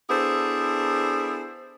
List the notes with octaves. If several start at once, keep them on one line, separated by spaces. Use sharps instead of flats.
B3 D4 E4 G#4 A4 C5